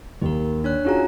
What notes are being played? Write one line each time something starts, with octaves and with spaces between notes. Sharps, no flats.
D#2 G4 A#4
D4 C#5 F#6
C#4 D#4 F4 F#4 G#4 A#5